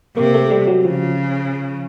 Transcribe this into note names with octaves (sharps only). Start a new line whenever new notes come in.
C3 A#3
A3
G3
F#3
C#3 F3